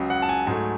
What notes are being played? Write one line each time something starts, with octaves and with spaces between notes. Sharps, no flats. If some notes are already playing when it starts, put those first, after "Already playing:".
Already playing: C#2 C#3 F#3
F#5
A5
G#5
G#2 F#3 A3 G#5